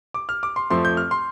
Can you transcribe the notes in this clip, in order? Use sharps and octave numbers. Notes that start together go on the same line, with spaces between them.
D6
F6
D6
C6
F2 F3 A3 C4 C6
G6
F6
C6